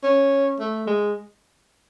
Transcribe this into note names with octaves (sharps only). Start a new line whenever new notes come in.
C#4
A3
G#3